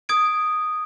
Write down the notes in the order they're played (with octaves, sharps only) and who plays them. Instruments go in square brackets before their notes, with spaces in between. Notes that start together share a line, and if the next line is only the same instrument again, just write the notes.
[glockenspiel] D#6 G#6 D7